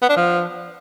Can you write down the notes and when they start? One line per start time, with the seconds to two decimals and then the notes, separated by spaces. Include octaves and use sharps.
0.02 B3
0.09 D4
0.16 F3